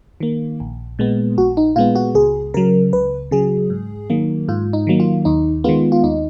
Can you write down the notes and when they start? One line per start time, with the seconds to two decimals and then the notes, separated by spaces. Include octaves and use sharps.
0.20 D#3 A#3
0.60 A#1
0.99 A#2 G#3 B3
1.38 A#1 F#4
1.57 D#4
1.76 A#2 G#3 B3 F4
1.95 F#4
2.15 C#2 G#4
2.54 C#3 F#3 A#4
2.93 C#2 B4
3.31 C#3 F#3 G#4
3.70 G#2
4.10 D#3 F#3 A#3
4.48 G#2 F4
4.73 D#4
4.87 D#3 F#3 A#3
5.00 F4
5.25 D#2 D#4
5.64 D#3 G#3 B3 F4
5.92 F4
6.04 D#2 D#4